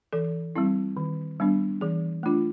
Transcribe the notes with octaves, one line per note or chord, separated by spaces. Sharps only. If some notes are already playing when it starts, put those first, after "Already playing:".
E3 A4
G3 C4 E4
D#3
G3 B3 D4
E3 G#4
A3 D4 F4